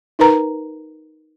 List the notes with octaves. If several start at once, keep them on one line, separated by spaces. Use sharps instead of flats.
D#4 A#4 B4 A#5